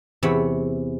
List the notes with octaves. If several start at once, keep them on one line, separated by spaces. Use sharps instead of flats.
E2 C3 C#5 B5